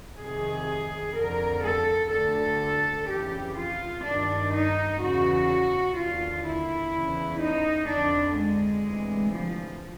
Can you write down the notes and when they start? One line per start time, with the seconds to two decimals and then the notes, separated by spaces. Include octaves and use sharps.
0.18 F2 C3 D#3 G#4
1.14 F2 D3 A#4
1.63 A4
2.11 D2 D3 A4
3.07 F2 C#3 E3 G4
3.55 F4
4.04 G2 D#3 D4
4.51 D#4
4.99 E2 C#3 E3 F#4
5.96 D#2 D3 F4
6.44 E4
6.92 E2 C#3 E3
7.40 D#4
7.88 F2 D3 D4
8.36 G#3
8.85 D2 C3 E3
9.32 F3